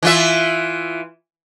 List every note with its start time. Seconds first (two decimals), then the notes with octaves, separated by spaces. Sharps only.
0.03 E3 F4 E5